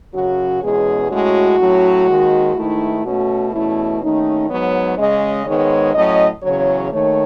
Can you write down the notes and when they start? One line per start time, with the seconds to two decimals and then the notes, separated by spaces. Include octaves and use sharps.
0.14 F#2 C#3 F#3 C#4 F#4
0.62 E2 B2 G#3 C#4 G#4
1.11 A2 G#3 C#4 F#4
1.60 A2 F#3 C#4
2.08 D#2 D#3 G#3
2.56 G#2 D#3 A3 E4
3.04 B2 A3 C#4 F#4
3.52 E2 B2 A3 C#4 E4
4.01 D#2 D#3 A3 C#4 D#4
4.49 G#2 F#3 B3 C#5
4.98 C#3 G#3 C#4 D#5
5.46 G#2 D#3 G#3 B3 C#5
5.95 A2 F#3 C#4 D#5
6.43 E2 C#3 F#3 C#4 C#5
6.92 D#2 D#3 A3 C#5